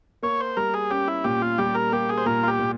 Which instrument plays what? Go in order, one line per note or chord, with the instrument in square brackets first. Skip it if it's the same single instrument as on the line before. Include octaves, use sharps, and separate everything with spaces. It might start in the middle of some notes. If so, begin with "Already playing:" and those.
[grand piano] A#3 [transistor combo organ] C#5
[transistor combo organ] C5
[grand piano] G3 [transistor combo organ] A#4
[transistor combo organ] G#4
[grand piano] C#4 [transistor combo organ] G4
[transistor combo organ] E4
[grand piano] A#2 [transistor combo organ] G4
[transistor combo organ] F4
[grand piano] G3 [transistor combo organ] G4
[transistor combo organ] A#4
[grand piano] A#3 [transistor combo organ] G4
[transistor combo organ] G#4
C5
[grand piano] A#2 [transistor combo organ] A#4
[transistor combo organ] F4
G4
[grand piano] A#2